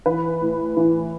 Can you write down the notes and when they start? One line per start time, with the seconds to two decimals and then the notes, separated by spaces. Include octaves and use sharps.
0.06 E3 B4
0.41 A2
0.77 E3